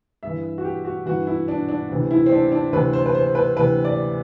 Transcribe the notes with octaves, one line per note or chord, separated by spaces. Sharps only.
G2 E3 E5
F#4
G4
F#4
G2 E3 F#4
E4
D4
D4
D2 C3 E3
E4
C4
D4
D4
D2 C3 E3 B4
C5
B4
C5
B4
D2 C3 E3 B4
D5